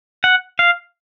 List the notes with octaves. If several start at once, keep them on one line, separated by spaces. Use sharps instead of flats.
F#5
F5